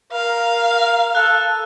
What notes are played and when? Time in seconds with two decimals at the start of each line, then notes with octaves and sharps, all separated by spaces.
0.13 A#4 F5
1.15 A4 F#6